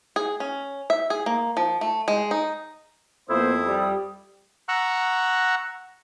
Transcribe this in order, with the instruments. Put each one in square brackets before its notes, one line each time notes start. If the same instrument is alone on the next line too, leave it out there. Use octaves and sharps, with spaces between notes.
[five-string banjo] G#4
C#4
E5
G#4
A#3
F3
A3
G#3
D#4
[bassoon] F2 [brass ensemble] A#3 B3 C5 [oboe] E4 [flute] D#6
[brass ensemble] G3
[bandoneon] F#5 A#5 C#6 E6 F#6